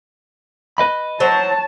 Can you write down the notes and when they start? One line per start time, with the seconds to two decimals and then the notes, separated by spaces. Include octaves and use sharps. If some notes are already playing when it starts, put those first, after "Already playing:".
0.78 B4 D#5 B5
1.20 F#3 C5 C#5 A5